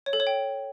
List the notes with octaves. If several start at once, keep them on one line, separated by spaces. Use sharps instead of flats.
C#5
A4
C#5
G5